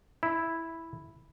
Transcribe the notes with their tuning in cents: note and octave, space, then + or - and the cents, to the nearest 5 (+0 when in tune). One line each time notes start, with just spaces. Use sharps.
E4 -5